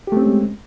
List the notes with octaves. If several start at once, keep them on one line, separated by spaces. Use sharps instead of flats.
G#3 A3 C4 C#4 G4